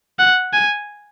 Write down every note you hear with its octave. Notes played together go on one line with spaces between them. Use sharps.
F#5
G#5